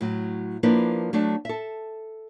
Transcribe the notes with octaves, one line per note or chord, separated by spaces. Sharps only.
A2 F#3
F3 A#3 D4 E4 B4
F#3 A3 D4
A4 E5